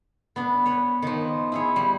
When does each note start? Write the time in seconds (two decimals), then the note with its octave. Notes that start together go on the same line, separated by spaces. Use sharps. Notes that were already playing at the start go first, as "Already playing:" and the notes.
0.36 B3 D4
0.66 B4 C#5
1.02 D#3 F3
1.52 E4 G#4 C#5
1.76 G3